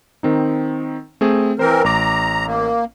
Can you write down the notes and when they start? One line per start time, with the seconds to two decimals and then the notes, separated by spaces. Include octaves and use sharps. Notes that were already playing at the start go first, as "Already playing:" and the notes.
0.23 D#3 C4 D#4
1.21 A3 C4 G#4
1.59 E3 C4 A#4 C5
1.84 A1 A#5 D6
2.46 A#3